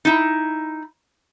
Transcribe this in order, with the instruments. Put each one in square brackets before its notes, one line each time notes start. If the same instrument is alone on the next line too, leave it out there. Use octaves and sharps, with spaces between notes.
[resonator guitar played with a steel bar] D#4 E4